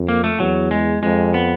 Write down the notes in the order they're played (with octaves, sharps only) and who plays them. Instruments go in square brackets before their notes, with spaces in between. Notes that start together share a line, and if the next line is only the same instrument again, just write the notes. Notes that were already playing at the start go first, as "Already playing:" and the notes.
Already playing: [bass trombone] F2
[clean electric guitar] A#3
A3
[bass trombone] E2 [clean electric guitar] F#3
[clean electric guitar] G#3
[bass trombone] F2 [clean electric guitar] G#3
[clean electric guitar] B3